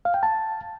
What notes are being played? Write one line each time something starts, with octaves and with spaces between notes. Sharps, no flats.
F5
G5
A5